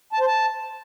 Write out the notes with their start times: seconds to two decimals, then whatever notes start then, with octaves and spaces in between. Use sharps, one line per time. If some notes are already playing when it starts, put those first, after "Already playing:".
0.13 A5
0.20 C5
0.27 A5